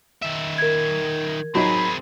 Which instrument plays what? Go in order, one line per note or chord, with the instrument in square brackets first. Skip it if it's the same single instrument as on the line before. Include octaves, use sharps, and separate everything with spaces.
[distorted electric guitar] D#3 E5
[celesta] A#4 G#6
[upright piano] F#3 D#4 [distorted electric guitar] C4 G#4 [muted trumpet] B5